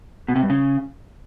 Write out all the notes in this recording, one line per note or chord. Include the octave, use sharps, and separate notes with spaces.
B2
C3
G2
C#3